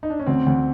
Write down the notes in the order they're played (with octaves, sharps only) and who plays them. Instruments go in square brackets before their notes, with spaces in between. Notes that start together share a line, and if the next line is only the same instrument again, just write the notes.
[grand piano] D#4
D4
C#4
[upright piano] D2 [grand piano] C4
[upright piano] D2